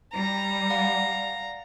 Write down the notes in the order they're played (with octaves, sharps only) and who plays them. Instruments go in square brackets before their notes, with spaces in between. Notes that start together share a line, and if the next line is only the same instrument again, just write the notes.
[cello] G3 [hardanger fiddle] A#5
[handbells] D5 F5 F#5